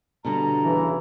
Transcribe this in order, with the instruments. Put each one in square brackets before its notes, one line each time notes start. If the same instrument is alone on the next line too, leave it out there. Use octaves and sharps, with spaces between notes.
[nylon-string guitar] B2 D3 G3 [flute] A#5
[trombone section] B1 C#3 E3